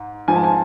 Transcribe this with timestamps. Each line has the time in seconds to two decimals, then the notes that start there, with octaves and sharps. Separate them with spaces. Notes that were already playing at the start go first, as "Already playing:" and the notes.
Already playing: G#2
0.28 G#2 F3 G#5
0.36 A5
0.44 G#5